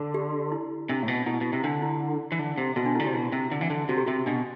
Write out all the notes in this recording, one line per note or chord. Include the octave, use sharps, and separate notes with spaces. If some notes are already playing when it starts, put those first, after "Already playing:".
Already playing: D3
G4
E4
C3 D4
A2
B2
B2 E4
B2
C3
D3 D4
E4
E3
D3
C3
B2 F#4
D4
E4
D3
G4
C3
B2 F#4
C3
D3
E3
D3
C3 F#4
G4
C3 F#4
B2 D4